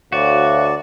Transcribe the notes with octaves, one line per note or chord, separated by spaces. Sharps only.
D2 F#4 C#5 D5 E5 F5